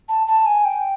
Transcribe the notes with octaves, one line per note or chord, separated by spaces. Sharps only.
A5
A5
G#5
G5